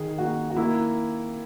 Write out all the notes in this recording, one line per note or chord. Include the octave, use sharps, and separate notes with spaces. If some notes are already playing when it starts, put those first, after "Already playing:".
Already playing: D#3 G#4
A#3 F#4
F#4
A#3 E4